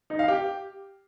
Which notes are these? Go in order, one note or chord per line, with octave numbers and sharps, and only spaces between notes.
D#4
F5
G4